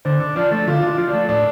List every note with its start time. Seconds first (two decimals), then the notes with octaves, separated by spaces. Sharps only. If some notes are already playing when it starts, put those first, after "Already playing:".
0.05 D3 C5
0.20 D4
0.36 F3 D4
0.51 A3
0.67 D3 F4
0.83 D4 F4
0.98 F3
1.08 D4
1.13 A3
1.29 A2 D4